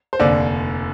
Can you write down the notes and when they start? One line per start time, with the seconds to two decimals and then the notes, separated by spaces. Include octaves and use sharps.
0.13 C5
0.20 F1 D#2 D3 D5